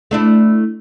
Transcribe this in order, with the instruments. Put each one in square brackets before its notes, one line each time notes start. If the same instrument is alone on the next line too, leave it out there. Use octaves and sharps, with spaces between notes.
[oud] A3 D4 E4